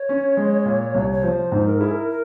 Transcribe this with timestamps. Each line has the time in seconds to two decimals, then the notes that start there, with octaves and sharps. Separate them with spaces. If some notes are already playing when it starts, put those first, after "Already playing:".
Already playing: C#5
0.09 C#4
0.37 G#3
0.65 A#2
0.94 C2
1.12 C#5
1.23 F3 C5
1.52 G#2
1.66 A#4
1.78 E4 G#4
1.91 A#4
2.09 A#4